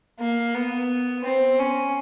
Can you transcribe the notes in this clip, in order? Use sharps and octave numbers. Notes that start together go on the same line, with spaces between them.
A#3
B3
C4
C#4